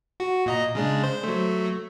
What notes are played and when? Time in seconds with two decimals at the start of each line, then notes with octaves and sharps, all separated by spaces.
0.20 F#4
0.46 A#2 D#5 A#5
0.75 C#3 G#3 D4
1.03 C5
1.23 F#3 A3